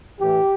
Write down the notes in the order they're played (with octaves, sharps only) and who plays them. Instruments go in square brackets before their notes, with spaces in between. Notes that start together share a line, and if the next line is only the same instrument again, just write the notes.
[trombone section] A2 E3 G4